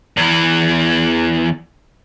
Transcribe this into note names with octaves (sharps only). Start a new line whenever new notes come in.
E2 E3